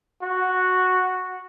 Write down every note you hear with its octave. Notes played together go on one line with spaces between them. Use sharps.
F#4